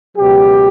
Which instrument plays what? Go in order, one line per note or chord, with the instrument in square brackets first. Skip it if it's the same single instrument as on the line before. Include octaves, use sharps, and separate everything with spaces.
[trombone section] C#2 B2 F#3 G4